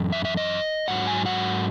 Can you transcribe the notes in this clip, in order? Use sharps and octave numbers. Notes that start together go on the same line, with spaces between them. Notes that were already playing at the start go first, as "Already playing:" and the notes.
Already playing: F#2 E3
E5
E5
D#5
G#2 F#3 F#5
G#5
F#5